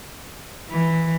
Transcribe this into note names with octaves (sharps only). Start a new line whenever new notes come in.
E3